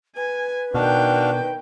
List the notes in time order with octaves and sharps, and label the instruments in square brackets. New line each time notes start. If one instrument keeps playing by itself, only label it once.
[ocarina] B4 [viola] G#5
[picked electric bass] B2 [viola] D#3 G5 [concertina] D4 F#4 F5